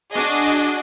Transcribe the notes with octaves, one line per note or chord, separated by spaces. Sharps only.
D4 F#4 G#4 D#5